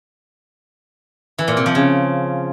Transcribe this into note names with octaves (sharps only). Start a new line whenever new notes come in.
E3
A#2
C3
F3
C#3